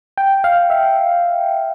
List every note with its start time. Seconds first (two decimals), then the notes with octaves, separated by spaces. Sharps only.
0.18 G5
0.44 F5
0.70 E5